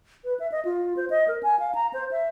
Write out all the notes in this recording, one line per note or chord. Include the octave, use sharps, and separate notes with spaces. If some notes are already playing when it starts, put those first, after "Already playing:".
B4
E5
D#5
F4
C5
D#5
A#4
G#5
F5
A#5
C5
E5